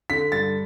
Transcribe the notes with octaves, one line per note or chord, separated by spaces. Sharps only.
D3 B6
G2 A6